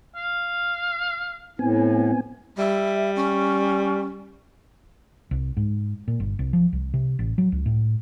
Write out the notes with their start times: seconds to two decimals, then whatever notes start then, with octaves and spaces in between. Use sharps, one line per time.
0.15 F5
1.59 A2 B3 C4 G#5
2.58 G3 E5
3.16 C#4
5.31 C2
5.57 G#2
6.08 A#2
6.20 G1
6.39 C2
6.53 F3
6.73 C2
6.94 C3
7.19 A1
7.38 F#3
7.52 C#2
7.66 A2